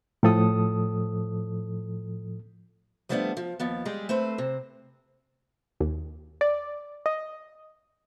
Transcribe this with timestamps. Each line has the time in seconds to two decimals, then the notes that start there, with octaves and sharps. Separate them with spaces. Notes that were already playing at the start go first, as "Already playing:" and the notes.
0.23 A2 F3 A4 D#6
3.09 F3 G3 A3 B3 C#4 D4
3.37 F3
3.60 D#2 F3 B3
3.85 G3 G#3 G4 G#4
4.09 A3 C4 B4 C5
4.38 C3 C4
5.81 D#2
6.41 D5
7.06 D#5